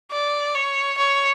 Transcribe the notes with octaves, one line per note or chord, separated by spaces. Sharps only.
D5
C#5
C#5